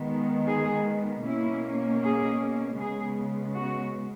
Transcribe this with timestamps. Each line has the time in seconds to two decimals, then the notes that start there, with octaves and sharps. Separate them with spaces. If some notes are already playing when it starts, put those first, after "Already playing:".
Already playing: D#3 G#3 B3
0.47 G#4
1.24 B2 A#3 C#4 E4
2.02 G#4
2.79 C#3 G#3 B3 G#4
3.56 F#4